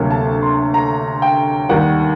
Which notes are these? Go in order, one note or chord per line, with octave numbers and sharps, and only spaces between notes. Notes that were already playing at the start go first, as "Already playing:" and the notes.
Already playing: D2 C3 F#3 A#3
A5
C6
A#5
G5
D#2 D#3 G3 F#5